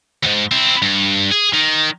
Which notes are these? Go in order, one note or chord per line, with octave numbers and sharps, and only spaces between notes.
D#2 G#2
C4 E4
G2
G#4
D#3